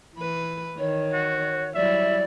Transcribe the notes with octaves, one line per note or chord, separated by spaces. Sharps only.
E3 B4
D#3 C#5
F#4
F#3 G3 E4 D5 E5